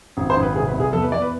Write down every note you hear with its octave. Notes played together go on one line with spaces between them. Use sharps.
G#1
C5
G#1
B4
C2 G#4
B4
C2
G#4
E2 A4
B4
E2 D5
B4